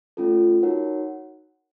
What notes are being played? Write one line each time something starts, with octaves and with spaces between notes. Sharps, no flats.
A3 C#4 F4 A4
D#4 F#4 A#4 C#5 F#5